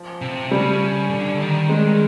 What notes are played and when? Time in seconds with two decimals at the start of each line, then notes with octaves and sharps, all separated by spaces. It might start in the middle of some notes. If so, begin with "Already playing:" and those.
Already playing: F3
0.22 C3
0.51 C#3 G3
1.10 D3
1.40 D#3
1.69 G#3